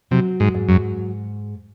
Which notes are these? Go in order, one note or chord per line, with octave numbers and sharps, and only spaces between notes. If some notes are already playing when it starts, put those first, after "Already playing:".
C3 F#3
G#2
G#2
F#2